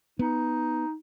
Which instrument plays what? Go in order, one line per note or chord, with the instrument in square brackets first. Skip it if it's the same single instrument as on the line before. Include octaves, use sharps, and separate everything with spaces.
[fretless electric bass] B3 [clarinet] D#4